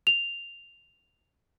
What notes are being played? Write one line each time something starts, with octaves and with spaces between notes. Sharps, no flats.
F7